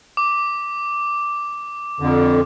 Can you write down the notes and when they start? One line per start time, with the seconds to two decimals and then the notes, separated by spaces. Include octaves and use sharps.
0.17 D6
2.00 F2 D3